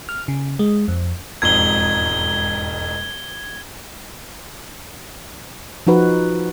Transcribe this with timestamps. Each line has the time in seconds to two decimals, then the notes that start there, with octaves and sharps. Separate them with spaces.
0.09 F6
0.28 C#3
0.59 G#3
0.88 F2
1.42 E1 F2 G#2 G#6 G7
5.87 F3 D#4 F#4 B4